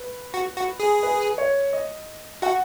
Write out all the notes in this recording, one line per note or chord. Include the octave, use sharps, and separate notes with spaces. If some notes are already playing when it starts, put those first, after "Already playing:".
Already playing: B4
F#4
F#4
G#4
B4
C#5
D#5
F#4 F#5